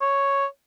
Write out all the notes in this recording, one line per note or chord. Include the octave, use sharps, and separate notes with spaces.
C#5